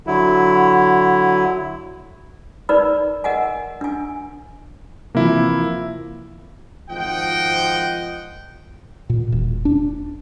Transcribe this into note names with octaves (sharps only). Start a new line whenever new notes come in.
D3 F#3 E4
D#4 A#4 B4 D5 B5
A#4 D#5 F#5 G#5
D4 G#5
C3 E3 F3 A#3 E4
G#1 F3 D#5 F#5 G5
A#2
E1
D4